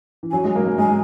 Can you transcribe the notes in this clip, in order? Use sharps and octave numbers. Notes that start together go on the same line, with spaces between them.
E3
F#3 G#5
G#3
A#3
G#3
G#3 G#5